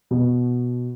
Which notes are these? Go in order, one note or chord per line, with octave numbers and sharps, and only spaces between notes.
B2